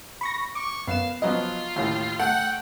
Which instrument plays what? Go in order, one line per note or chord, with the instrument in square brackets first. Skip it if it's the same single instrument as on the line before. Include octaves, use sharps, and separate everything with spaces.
[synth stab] B5 C#6 A#6
[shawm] C#6 [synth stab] D6
[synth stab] F#2 E7 [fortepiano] B3 [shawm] F5
[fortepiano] F3 F#3 B3 [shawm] F4 [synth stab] D#5
[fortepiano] D#2 A2
[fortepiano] A3 [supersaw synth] F#5 [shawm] G5